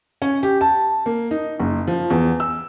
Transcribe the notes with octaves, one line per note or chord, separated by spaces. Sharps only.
C#4
G4
A5
A#3
D#4
F#1
F3
E2
E6